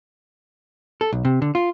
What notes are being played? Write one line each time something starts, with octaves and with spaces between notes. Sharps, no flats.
A4
B1
C3
D3
F4